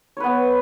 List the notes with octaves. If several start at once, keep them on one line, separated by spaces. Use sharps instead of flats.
B3 B4 C#5